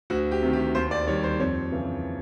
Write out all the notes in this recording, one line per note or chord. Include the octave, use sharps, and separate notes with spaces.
D2 F#4
G4
C3 D#3
G4
D#2 C5
D5
D#3 G3 C#5
C5
F2 C#5
C#3 E3